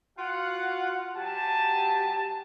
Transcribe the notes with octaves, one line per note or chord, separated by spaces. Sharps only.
F4 F#4 F5 F#5
F#3 G4 G#5 A5